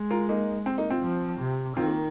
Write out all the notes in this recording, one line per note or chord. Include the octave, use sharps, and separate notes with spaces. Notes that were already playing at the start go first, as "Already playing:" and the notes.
Already playing: G#3
F4 A#4
A#3 D#4
C4
A#3 D#4
C4 F4
F3
C3
D#3 C4 F4
A#3